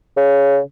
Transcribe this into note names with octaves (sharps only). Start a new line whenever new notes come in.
C#3